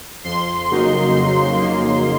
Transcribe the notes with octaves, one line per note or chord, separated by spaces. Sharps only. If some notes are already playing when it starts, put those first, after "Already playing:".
F2 C6
C#3 F#3 A#3 D#4
F2
C#3 F#3 A#3 D#4